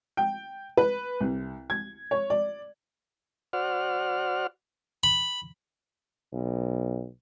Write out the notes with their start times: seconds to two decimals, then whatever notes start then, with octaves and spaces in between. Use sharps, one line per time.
0.17 G5
0.77 B4
1.21 C2
1.70 G#6
2.11 C#5
2.30 D5
3.53 F#4 C5 D5 F#5 F6
5.03 B5
6.33 B1